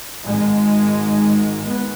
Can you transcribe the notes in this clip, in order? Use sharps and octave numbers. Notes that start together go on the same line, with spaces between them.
G#1 G#2 G#3
G#1 G#2 B3